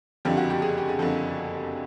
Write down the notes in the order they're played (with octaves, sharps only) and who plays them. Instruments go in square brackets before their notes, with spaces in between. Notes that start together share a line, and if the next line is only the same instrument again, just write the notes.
[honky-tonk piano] F#1 F2 D3 F3 G4
F#4
G4
G#4
G4
G#4
F#1 F2 D3 F3 A4